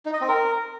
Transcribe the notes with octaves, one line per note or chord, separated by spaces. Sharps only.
D#4
D#5
C4
A#4